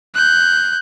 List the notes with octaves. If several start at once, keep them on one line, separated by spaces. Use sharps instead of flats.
F#6 G6